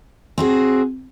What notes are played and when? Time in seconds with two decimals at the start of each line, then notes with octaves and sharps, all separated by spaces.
0.38 C4 F#4 G#4